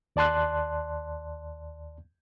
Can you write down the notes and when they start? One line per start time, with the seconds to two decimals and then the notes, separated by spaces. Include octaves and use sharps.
0.16 D#2 D5 A5 C6 F#6